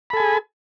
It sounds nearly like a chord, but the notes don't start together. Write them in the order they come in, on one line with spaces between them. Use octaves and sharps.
B5 A4 G#5 G#4